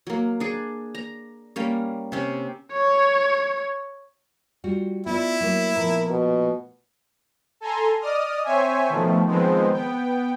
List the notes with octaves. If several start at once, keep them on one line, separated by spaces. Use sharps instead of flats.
F#3 A#3
D4 G#4
A#5
G3 A#3 C#4
C3 C#4
C#5
G3 F4 F#4
B3 E4 F4 D5
F#3 A#3
A#2 F3 B3 A#4
B2
A4 G#5 A#5 C6
D5 D#5 D#6 F6
C4 C5 C#5 E5 G#5
B2 D#3 F3 A3
D#3 F3 G#3 B3 C4
B3 G5